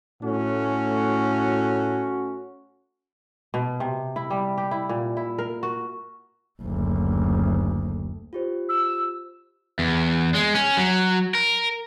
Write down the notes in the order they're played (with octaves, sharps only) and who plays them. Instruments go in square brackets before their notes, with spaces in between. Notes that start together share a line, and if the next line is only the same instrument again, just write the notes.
[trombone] A2 [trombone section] A3 C#4 F#4
[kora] B2
C3
E4
G3
G4
E4
A#2
E4
A#4
F#4
[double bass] F#1 D2
[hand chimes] F4 G4 C5
[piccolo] E6
[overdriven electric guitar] E2
G#3
C#4
F#3
A#4